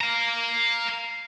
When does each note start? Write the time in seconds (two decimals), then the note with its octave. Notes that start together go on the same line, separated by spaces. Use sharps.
0.01 F5 A#5